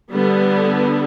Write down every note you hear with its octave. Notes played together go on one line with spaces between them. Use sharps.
D3 G3 B3